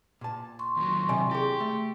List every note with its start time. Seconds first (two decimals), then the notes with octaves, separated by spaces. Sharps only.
0.21 A#2 A5
0.59 C6 C#6
0.77 D#2 F#3
1.09 C3 D5 G#5
1.31 E4 G4 G#4
1.60 A3